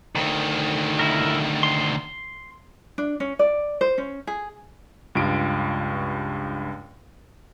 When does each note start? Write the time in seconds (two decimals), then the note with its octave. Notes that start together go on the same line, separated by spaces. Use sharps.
0.15 D2 D#3
0.99 E4 A#4
1.63 C6
2.98 D4
3.20 C#4
3.39 D5
3.81 C5
3.98 C#4
4.27 G#4
5.15 C#2 G2 F4 D7